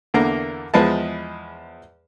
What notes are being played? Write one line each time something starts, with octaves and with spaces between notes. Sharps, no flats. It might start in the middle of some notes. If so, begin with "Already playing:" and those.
E2 D3 A#3 A#4 A#5
E2 F3 G#3 B4 D#5 A5